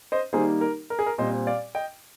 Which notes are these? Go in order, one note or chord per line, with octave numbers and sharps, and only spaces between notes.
C5 D#5
D#3 G3 A#3 D#4 G#4 C5
A#4
A#4
G#4
A#4
A#2 G3 C4 C5 D#5
D5 F5
D#5 G5